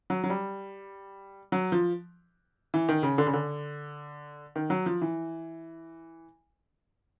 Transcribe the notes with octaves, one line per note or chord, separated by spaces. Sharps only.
F#3
F#3
G3
F#3
F3
E3
D#3
C#3
D3
C#3
D3
D#3
F#3
F3
E3